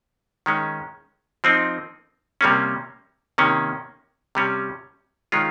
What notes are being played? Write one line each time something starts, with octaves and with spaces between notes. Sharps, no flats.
D#3 G#3 C#4
F3 C4 D#4
C3 G3 A#3 C#4
C3 D#3 A#3 C#4
C3 G3 C#4
D#3 G#3 C#4 F4